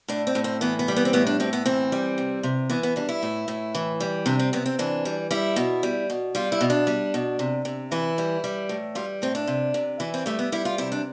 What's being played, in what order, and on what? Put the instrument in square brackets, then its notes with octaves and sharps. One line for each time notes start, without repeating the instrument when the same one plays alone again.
[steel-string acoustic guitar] A2 D4
C4
A2
C4
E3 B3
B3
G3
B3
C4
A2 B3
D4
A2 C4
B3
E3 C4
G3
C3
C3
E3 B3
B3
G3 D4
E4
A2
A2
E3
G3
C3 D4
C4
C3 B3
C4
E3 D4
G3
G3 E4
B2
G3
B2
G3 F4
E4
B2
D4
G3
B2
C3
C3
E3 E4
G3
G3
A2
G3 F4
A2 C4
D4
C3
C3
E3 E4
C4
G3 A3
B3
G3 E4
F4
C3 E4
D4